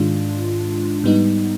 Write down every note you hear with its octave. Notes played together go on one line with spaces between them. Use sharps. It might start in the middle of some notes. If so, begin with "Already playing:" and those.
Already playing: G#2 D#3 G#3 D4 F4
G#2 G3 B3 D#4